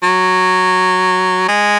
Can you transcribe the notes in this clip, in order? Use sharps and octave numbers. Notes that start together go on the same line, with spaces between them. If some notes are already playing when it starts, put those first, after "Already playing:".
F#3
G#3